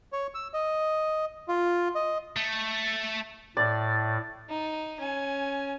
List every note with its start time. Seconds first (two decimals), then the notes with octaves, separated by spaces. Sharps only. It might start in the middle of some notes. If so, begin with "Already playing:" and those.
0.13 C#5
0.35 E6
0.54 D#5
1.48 F4
1.95 D#5
2.36 A3
3.57 A2 D5
4.49 D#4
5.00 C#4 G#5